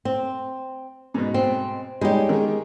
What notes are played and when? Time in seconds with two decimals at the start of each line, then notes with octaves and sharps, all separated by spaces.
0.05 C4
1.14 G#2 B2
1.34 C4
2.01 G3 G#3 D#4 G4 C#5
2.29 D#3 G#4